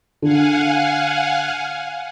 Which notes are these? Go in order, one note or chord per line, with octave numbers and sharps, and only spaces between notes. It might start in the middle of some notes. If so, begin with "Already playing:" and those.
D3 F5 F#5 G#5